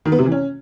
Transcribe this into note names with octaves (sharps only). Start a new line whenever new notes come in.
D#3
B3
C3
E3
C#4